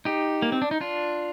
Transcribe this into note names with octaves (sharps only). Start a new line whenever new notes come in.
D#4 G4
A#3
C4
D4
D#4
D4 F4